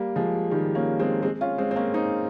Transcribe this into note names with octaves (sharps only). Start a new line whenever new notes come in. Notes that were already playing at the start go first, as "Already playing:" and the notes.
Already playing: G3 A#3
F3 G#3
D#3 G3
A#3 C#4
G#3 C4
G#3 C4
C#4 F4
G#3 C4
C4
A#3 C#4
C4 D#4